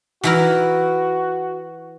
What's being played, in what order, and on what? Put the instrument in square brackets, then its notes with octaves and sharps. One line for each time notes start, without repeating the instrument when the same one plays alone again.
[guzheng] E3 E4 A#4 [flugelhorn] F#4